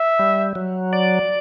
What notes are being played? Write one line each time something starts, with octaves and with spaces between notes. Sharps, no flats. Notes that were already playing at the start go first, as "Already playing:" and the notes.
Already playing: E5
G3
F#3
D5